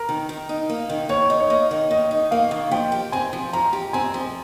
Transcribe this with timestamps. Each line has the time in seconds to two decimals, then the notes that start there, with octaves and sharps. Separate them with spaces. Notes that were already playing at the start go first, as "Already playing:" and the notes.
Already playing: A#4
0.09 D#3
0.29 D#3
0.49 D#4
0.69 A#3
0.90 D#3
1.09 D#3 C#5
1.30 D#4
1.40 C#5
1.50 A#3 D#5
1.71 D#3
1.91 D#3 D#5
2.11 D#4
2.31 A#3 F5
2.51 D#3
2.71 F3 G5
2.92 G4
3.12 C4 G#5
3.33 F3
3.53 F3 A#5
3.73 G4
3.93 C4 G#5
4.14 F3